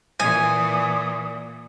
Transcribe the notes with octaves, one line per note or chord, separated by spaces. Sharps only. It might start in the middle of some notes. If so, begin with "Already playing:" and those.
A#2 E3 G#5 D#6